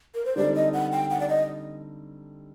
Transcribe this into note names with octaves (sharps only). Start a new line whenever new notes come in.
A#4
C5
D3 G3 C4 D#4 A4 D5
D#5
F#5
G5
F#5
D5
D#5